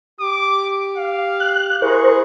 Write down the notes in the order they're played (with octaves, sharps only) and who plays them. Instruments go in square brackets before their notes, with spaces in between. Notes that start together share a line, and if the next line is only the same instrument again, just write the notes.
[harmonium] G4 [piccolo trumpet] D6
[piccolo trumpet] F5
[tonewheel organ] F#6
[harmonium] E4 G#4 [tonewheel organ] A#4 C5 [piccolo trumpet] C#6